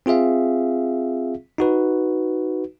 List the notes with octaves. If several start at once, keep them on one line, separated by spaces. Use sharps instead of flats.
C4 F4 G#4 E5 F5
D#4 F#4 B4